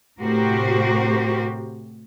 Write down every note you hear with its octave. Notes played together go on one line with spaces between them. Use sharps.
A2 C3 F#4 G4 A#4 C5